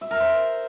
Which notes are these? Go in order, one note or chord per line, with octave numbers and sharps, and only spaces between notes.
E5
A#4
C5